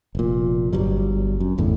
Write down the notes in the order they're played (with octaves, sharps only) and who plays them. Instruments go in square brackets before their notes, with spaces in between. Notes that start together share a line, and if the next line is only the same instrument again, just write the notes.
[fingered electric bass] F1 A#2
G1 G2 F#3 G3
F#2
G1 E2 A2 D3